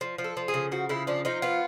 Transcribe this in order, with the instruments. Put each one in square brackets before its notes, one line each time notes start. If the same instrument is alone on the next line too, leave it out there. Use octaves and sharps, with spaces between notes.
[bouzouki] F3
F3
A4
F3
G#4
C#3
F3 F#4
C#3 E4
F3 D4
F3 D#4
B3 F4